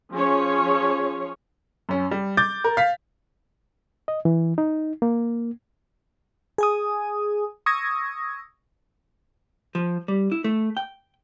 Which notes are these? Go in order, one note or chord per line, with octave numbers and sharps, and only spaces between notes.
F3 C#4 G#4 C#5
F#2 C#4
G3
D6 G6 A6
A#4
F5 B6
D#5
E3
D#4
A#3
G#4 G#5 D#6
C#6 D#6 E6 G#6 A#6
F3
G3
E4
A3
G5